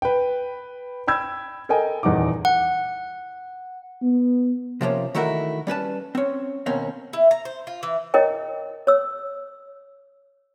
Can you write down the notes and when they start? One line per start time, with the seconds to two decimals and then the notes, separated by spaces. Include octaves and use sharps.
0.02 B4 G5
1.07 G5 B5 E6 G#6
1.69 A4 A#4 D#5 G5 G#5
2.03 D#1 E2 D#4 F#5 D6
2.45 F#5
4.02 B3
4.81 C3 F3 A#3 C#4
5.15 D#3 E3 A3 E4 F#4 A#4
5.67 G3 C#4 B4 A5
6.15 C4 C#4
6.66 D#2 B2 A#3 C4 C#4
7.13 E4
7.31 A#5
7.45 C5
7.67 F4
7.83 E3
8.14 E4 A#4 C#5 D#5 G5
8.87 C#5 E6